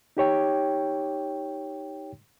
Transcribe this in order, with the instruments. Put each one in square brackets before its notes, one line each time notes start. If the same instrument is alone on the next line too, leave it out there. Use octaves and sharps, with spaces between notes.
[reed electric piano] D#4 G4 C#5 G5